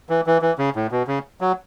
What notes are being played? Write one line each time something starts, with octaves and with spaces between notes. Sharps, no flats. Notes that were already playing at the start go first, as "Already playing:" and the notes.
E3
E3
E3
C#3
A2
B2
C#3
F#3